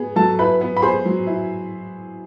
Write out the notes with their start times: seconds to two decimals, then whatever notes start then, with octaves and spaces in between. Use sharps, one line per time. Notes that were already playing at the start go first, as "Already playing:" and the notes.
Already playing: B3 G#4
0.16 F#3 A4 A5
0.39 E4 B4 B5
0.61 B3
0.77 B5
0.82 G#4 C5 C6
1.05 F#3
1.27 E4